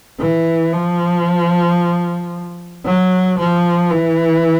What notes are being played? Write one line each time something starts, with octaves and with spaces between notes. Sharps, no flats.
E3
F3
F#3
F3
E3